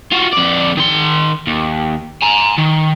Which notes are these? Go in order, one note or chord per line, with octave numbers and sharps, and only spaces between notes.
F4 F#4
F2 D5
D#3 C6
D#2
G#5 A#5
D#3